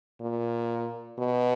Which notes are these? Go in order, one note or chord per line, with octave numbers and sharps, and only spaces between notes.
A#2
B2